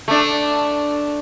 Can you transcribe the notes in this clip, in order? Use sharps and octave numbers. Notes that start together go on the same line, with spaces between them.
A3 D4